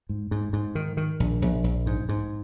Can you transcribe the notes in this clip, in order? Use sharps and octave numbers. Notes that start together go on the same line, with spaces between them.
G#2
G#2
G#2
D#3
D#3
A#1
A#1
A#1
G#2
G#2